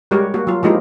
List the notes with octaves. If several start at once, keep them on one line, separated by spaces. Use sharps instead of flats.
G3 G#3 F#4 G4 A#4 C#5
A#3 F#4
F#3 F4
F3 G#3 A#3 D#4 E4 G4